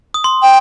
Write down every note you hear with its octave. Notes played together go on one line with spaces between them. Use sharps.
D#6
C6
G5